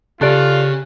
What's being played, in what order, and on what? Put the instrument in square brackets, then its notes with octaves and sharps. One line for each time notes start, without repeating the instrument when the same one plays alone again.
[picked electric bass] C#3 [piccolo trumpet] F4 [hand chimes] G4 F#6 [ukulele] A4 D5